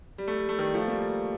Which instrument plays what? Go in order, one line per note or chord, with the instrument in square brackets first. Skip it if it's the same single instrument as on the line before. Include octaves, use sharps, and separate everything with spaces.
[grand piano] G3
A3
G3
A3
D#3 G3
F3 A3
G3 A#3